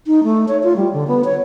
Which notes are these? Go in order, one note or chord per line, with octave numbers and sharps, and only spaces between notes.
D#4
A3
C#5
F4
G3
D3
B3
C#5